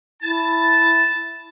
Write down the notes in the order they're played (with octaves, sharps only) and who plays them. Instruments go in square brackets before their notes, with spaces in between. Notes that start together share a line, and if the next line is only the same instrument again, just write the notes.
[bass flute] E4 [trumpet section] A5